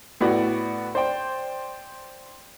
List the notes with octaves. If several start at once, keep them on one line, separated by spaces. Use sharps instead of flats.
A2 B3 F#4 D5
C5 D5 G5